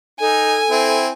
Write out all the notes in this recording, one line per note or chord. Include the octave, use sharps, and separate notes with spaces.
D#4 A4 G#5
C4 E4